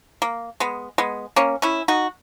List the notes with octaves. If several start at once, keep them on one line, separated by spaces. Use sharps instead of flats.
A#3
G#3 B3
G#3 B3
A#3 C#4
C#4 E4
D#4 F#4